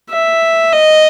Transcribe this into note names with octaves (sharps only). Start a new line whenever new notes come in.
E5
D#5